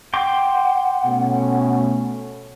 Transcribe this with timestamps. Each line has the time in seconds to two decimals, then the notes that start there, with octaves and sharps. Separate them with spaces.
0.14 F#5 G5 C6 D6
1.04 B2 A3 C#4